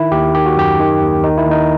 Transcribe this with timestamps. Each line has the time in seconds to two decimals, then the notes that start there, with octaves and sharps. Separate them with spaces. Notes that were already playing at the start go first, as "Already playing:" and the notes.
Already playing: D#3 E4
0.12 D#2 G4
0.35 D#3 G4
0.46 F#4
0.56 F#2 G4
0.79 D#3
1.02 D#2
1.24 D#3 D#4
1.38 E4
1.46 D#2
1.51 D#4